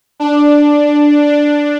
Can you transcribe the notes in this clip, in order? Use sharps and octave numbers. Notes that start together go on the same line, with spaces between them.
D4
D4